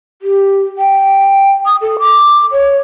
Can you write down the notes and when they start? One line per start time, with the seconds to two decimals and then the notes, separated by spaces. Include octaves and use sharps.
0.22 G4
0.78 G5
1.65 D#6
1.82 A4
2.00 D6
2.52 C#5